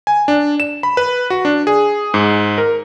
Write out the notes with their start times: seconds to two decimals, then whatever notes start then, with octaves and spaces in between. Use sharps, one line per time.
0.07 G#5
0.28 D4
0.60 E7
0.83 B5
0.97 B4
1.30 F#4
1.45 D4
1.67 G#4
2.14 G#2
2.58 A#4